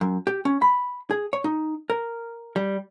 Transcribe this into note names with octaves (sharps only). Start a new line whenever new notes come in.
F#2
G4
C#4
B5
G#4
C#5
D#4
A#4
G3